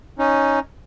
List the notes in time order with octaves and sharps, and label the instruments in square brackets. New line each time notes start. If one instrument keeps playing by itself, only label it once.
[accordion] C#4 D#4